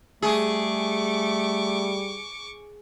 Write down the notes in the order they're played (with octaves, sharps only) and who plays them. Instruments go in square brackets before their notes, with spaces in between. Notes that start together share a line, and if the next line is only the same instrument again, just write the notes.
[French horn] G3 [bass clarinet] A3 [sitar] G#4 [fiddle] C#6 D6